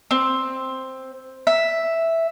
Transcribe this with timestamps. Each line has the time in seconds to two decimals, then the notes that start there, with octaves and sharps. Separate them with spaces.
0.11 C4
1.47 E5